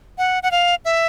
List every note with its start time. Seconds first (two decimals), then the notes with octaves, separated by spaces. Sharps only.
0.18 F#5
0.43 F#5
0.51 F5
0.85 E5